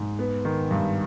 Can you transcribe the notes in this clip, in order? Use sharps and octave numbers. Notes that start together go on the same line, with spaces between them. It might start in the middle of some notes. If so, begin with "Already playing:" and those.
Already playing: G#2
B3
D#3
G2